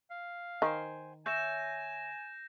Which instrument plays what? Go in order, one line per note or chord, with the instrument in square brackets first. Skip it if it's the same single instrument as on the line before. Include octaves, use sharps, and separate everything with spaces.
[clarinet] F5
[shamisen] D#3 [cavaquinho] C5 G5 G#5
[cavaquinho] C#5 E5 [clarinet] G#5 [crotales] G6 A#6 E7